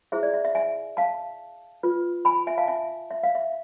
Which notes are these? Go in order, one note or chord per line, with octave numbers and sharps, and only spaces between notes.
E4 G#4 C5 E5
D5
E5
E5
E5 G#5
F5 A5
F4 B4
G#5 B5
E5 G#5
F5 A5
E5 G#5
E5
F5
E5